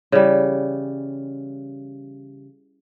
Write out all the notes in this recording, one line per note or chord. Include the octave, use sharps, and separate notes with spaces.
C#3 E3 G3